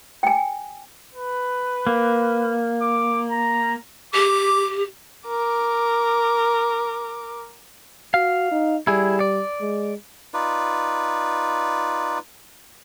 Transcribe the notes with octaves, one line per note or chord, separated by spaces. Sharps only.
G5 G#5
B4
A#3
D6
A#5
G4 D6
A#4 D6
F#4 F5
D#4
G3 E4 G#4
D5
G#3
D#4 F4 B4 D5